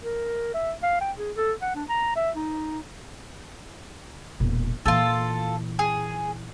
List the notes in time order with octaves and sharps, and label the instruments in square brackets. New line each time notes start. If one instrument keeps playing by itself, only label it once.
[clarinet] A#4
E5
F5
G5
G#4
A4
F#5
D4
A#5
E5
D#4
[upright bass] E1 A#2
[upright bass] A#2 E3 [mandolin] F4 A4
[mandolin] G#4